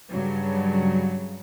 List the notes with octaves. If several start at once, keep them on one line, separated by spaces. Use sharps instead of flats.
G2 C#3 F#3